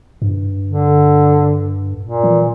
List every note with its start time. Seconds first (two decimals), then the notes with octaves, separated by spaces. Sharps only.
0.22 G2
0.66 D3
2.03 A#2
2.24 E3